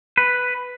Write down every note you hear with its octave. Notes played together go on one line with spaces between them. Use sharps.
B4